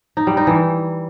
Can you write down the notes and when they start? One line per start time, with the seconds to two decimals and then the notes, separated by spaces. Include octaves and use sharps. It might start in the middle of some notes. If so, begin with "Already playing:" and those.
0.17 D#4
0.27 G3
0.37 D#4
0.47 E3